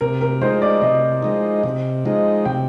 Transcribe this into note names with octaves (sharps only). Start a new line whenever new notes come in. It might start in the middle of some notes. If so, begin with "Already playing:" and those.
C3 A#4
A#4
F3 G#3 D#4 C5
D5
C3 D#5
F3 G#3 D#4
C3
F3 G#3 D#4
C3 G5